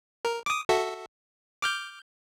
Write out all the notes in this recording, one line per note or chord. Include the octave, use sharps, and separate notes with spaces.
A#4
D6 D#6
F#4 A4 E5
D6 F6 G6